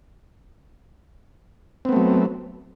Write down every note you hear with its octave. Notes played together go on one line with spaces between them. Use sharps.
F#3 A3 B3 C4